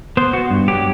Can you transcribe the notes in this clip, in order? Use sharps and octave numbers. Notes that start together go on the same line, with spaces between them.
B3 C5
B3 F#4
G2
F#3 G4